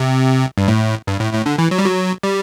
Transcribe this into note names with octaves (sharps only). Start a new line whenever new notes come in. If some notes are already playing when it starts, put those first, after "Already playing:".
Already playing: C3
G2
A2
G2
A2
A2
D3
E3
F#3
G3
F#3
G3